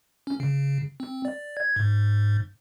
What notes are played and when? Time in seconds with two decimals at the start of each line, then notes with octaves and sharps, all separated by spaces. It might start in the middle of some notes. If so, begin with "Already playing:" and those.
0.27 C#4
0.40 C#3
1.00 C4
1.25 D5
1.57 G#6
1.76 G#2